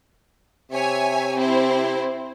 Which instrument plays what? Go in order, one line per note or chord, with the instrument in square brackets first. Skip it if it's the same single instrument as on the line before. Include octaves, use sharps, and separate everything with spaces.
[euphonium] C3 [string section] C#5 E5 G#5
[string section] C4 E4 C5